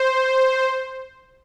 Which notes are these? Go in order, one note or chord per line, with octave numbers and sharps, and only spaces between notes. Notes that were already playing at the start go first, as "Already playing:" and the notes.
Already playing: C5